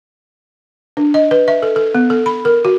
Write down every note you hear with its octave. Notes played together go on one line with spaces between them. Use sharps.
D4
D#5
B4
E5
A4
A4
B3
A4
B5
A#4
F#4